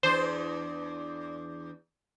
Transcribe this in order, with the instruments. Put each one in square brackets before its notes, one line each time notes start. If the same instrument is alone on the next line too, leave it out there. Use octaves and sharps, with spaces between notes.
[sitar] E2 D4 [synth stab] C5